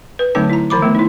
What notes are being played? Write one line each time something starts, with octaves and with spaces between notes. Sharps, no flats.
B4
D3 F#3 A3 C4 D#4 A5
E4 A#5
D#3 F3 B5 D6
A3 B3
D#4 E4